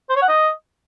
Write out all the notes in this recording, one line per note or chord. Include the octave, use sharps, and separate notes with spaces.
C5
C#5
F#5
D#5